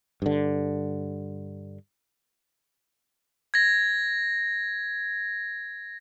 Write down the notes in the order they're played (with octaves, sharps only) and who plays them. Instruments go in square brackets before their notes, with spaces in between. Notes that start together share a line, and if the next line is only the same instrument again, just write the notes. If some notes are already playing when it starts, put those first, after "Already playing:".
[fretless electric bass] G2 D3
[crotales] G#6 A#6